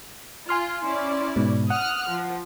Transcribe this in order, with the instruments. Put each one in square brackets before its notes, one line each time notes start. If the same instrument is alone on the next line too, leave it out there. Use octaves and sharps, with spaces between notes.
[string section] F4 [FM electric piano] G#5 C6 F6
[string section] C#4 E4 D5
[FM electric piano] G#2 B2
[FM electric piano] F#5 [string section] D#6 F6 F#6
[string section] F3